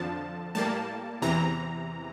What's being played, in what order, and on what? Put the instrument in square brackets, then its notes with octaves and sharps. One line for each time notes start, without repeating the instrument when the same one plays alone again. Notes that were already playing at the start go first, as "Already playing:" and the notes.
Already playing: [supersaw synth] F2 D3 F3 A5
A2 G3 A#3 A5
E2 C3 E3 A#5